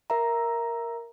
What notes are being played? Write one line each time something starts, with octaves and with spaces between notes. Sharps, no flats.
A#4 E5 A#5